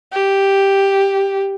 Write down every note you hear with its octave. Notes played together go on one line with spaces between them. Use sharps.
G4